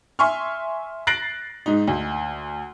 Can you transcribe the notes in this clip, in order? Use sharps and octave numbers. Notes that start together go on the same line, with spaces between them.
E5 G#5 C6 C#6 F6
F#6 A6 A#6 C7 D7 F#7
G#2 D#4
D2